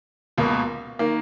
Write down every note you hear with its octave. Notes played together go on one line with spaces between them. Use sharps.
C#2 B2 A#3
D#3 A#3